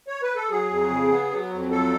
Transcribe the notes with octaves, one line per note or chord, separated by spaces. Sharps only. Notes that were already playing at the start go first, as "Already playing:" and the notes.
C#5
B4
A4
F#3 G#4
F2
C#3
B3
F#3
F2
F#3 A4